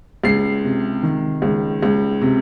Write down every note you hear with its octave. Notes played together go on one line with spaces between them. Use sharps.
C#2 C7
C3
D#3
C#2
C#2
C3